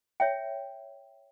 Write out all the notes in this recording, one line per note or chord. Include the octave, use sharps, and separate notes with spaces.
C#5 E5 G5